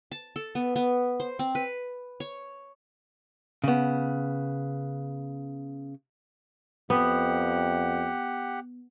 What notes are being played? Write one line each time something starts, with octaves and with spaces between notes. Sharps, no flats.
A5
A4
B3
B3
C5
C4
B4
C#5
C#3 B3
F2 B3 G4 F#5